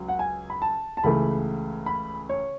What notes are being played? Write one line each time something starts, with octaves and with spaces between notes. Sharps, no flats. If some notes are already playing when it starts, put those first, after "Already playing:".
Already playing: C#2 F#3
F#5
G#5
B5
A5
A5
C#2 C#3 E3 A3 B5
B5
C#5